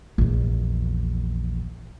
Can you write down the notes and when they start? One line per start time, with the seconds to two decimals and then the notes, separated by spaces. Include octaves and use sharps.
0.18 A#1 E2